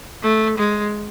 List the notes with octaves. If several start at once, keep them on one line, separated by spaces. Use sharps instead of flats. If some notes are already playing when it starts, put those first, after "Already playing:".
A3
G#3